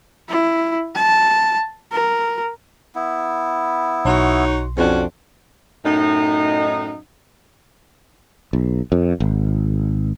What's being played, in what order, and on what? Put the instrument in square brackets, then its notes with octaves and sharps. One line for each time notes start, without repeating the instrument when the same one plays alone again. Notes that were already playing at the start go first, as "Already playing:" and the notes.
[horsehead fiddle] E4
A5
A#4
[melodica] B3 E4
[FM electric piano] B1 C6 [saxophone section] D#4 F#4 C#5
[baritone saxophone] F2 [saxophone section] C#4 D4 F#4
[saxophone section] F#2 A2 D#4
[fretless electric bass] B1
F2
G#1